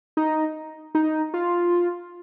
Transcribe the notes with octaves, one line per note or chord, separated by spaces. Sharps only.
D#4
D#4
F4